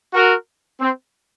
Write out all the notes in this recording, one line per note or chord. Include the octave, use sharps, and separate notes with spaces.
F#4 A#4
C4